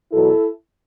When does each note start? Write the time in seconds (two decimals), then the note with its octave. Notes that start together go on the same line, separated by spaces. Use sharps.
0.12 E2 B2 F#3 E4 A4